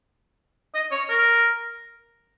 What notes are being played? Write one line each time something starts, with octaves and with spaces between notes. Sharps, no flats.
D#5
C#5
A#4